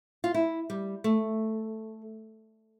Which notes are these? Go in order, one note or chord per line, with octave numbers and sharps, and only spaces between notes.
F4
E4
G3
A3